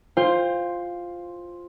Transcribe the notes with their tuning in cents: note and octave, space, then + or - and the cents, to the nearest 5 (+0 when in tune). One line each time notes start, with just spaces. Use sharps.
F4 +5 C5 +0 G5 +35